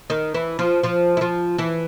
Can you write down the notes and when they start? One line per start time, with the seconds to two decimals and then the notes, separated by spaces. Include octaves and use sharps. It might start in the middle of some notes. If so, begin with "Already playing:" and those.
0.10 D#3 D#4
0.34 E3 E4
0.59 F3 F4
0.83 F3 F4
1.17 E4
1.21 F3 F4
1.58 E3 E4